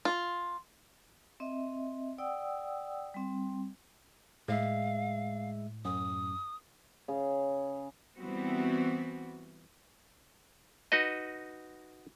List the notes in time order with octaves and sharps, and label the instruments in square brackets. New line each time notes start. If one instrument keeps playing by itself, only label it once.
[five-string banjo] F4
[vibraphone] C4 D#5 E5
D5 F#5 G5 D#6 E6
G3 C4
[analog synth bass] A2 [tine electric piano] G#3 E5 [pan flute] F5
[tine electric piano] F#2 [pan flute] D#6
[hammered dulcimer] C#3
[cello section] E3 G3 B3 C4 F#4
[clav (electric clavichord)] D#4 F#4 B4 D#5